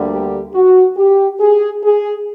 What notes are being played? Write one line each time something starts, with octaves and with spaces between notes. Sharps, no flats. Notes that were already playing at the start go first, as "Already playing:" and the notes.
Already playing: D2 D3 G3 A#3
G4
F#4
G4
G#4
G#4